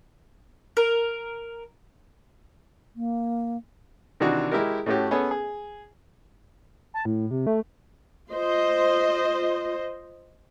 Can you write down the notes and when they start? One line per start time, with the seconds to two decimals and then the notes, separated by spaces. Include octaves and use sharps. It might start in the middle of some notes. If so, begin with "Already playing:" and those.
0.77 A#4
2.96 A#3
4.20 C3 D#3 E3 D4 F#4
4.52 G#3 E4 G4 A#4
4.86 A2 A3 C#4 F#4 G4
5.11 B3 C#4 G#4 A4
5.31 G#4
6.94 A5
7.05 A2
7.31 C3
7.47 A3
8.33 F4 C5 D#5